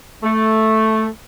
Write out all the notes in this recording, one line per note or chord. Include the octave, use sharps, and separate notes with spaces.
A3